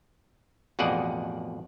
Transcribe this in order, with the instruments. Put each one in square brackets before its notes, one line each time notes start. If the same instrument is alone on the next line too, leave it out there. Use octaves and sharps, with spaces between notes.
[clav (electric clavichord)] A1 F2 B2 G#4 D5 F#5